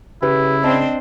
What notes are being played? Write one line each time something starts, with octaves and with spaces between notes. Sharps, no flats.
C#3 E4 G4 B4
C4 D4 C5 D#5 A5